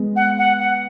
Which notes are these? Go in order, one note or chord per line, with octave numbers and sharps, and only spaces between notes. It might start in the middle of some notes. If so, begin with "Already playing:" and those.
Already playing: G#3 B3
F#5
F#5
F#5